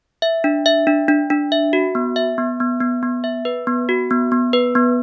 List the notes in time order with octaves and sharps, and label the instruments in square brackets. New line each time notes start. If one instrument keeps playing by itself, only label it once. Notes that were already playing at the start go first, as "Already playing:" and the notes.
[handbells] E5
D4
E5
D4
D4
D4
E5
F#4
B3
E5
B3
B3
B3
B3
E5
B4
B3
F#4
B3
B3
B4
B3